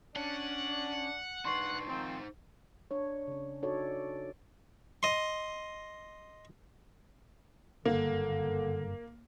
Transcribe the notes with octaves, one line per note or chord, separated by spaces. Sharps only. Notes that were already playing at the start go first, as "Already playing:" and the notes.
C#4 D4 D5 F#5
D4 D#4 B4 C6 C#6 C7
D#3 F3 C4 D#4 C5
D4 C#5
C#3 C#4
D4 D#4 F#4 A4 C#5 D5
D#5 C6
F#1 G2 D3 A#3